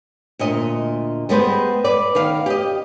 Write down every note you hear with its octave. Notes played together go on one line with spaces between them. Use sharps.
D2 A#2 D#5
G3 G#3 B3 C5
B4 D5
D#3 B3 F5
G4 D#5